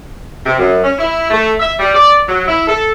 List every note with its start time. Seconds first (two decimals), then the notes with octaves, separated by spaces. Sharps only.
0.46 C3
0.59 F#2
0.84 C#4
0.98 E4
1.30 A3
1.60 E5
1.80 G3
1.94 D5
2.28 F#3
2.48 E4
2.68 A4